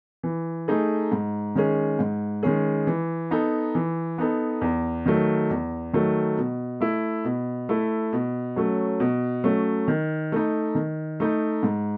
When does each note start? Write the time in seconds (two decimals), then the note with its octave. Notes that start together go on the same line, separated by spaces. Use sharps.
0.23 E3
0.68 A3 D#4 G#4
1.12 G#2
1.55 D#3 G#3 C#4 G#4
1.99 G#2
2.43 D#3 G#3 C#4 G#4
2.87 E3
3.31 B3 D#4 A4
3.75 E3
4.18 B3 D#4 A4
4.61 E2
5.06 D#3 F#3 A3
5.50 E2
5.93 D#3 F#3 A3
6.38 B2
6.81 A3 E4
7.25 B2
7.69 A3 E4
8.13 B2
8.56 F#3 A3 C#4
9.00 B2
9.44 F#3 A3 C#4
9.88 D#3
10.32 A3 D#4
10.75 D#3
11.20 A3 D#4
11.63 G#2